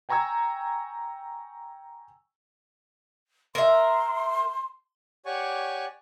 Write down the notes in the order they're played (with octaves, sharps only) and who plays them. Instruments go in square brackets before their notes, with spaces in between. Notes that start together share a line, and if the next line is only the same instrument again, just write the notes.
[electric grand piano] G5 G#5 A#5 C#6 E6 G#6
[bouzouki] A#4 E5 [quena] C6
[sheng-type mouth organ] G4 C#5 D5 F#5 G#5 C#6